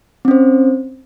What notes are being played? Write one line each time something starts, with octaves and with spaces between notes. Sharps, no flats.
C4 C#4 C5